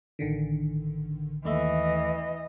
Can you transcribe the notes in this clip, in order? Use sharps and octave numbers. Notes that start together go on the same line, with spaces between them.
A1 D3 D#3
D#2 E3 A3 D#5 E5